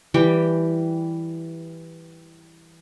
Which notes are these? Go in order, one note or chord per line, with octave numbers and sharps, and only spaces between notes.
E3 G3 G4 G5